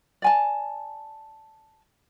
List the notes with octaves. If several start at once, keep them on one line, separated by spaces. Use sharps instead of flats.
D5 G#5 A5